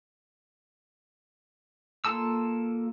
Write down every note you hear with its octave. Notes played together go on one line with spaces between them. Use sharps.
A#3 F4 A4 A5 E6